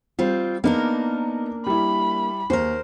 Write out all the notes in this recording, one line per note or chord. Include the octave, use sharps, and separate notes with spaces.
G3 C4 F4
A#3 B3 D4 D#4 A#4
G3 E4 B5
D#2 A#4 C5